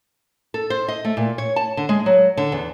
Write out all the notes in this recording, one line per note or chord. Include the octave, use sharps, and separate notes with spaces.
A4
C5
D#5
A3
A#2
C#5
A5
D3
G#3
F#3
D3
E2